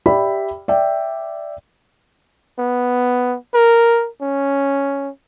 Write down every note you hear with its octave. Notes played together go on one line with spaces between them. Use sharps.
G4 D5 E5 G5 B5
D5 E5 G5
B3
A#4
C#4